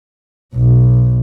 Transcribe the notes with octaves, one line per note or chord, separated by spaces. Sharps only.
B1 B2